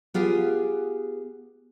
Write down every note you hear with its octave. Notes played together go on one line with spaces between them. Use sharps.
B3 F4 G4 G#4